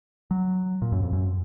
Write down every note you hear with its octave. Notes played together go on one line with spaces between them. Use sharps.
F#3
A#2
F#2
F2
F#2